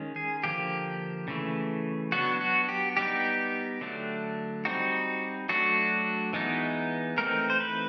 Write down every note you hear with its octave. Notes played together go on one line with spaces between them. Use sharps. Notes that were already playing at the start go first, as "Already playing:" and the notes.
Already playing: D#3 G#3 C#4
G#4
D3 F3 A#3 G4
C#3 E3 A3
F#3 B3 D4 F#4
F#4
G4
G3 B3 D#4 G4
D3 F#3 A3 D4
G3 C4 D#4 F#4
F#3 A3 D4 F#4
E3 G#3 B3 D#4
E3 A3 C4 D#4 A#4
C5
B4